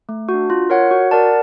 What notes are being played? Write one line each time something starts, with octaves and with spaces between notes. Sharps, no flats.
A3
F#4
D4
F4
A#4 C#5 F#5
F#4
A#4 D5 F#5 A5